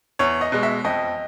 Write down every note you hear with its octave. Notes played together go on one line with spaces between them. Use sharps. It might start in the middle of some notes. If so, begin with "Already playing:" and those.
E2 C#5
D#5
B2 G#3
E5
F2 D#5